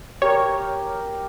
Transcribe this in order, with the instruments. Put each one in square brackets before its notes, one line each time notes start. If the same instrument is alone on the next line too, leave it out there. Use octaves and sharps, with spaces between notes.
[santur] G4 A#4 [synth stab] C#5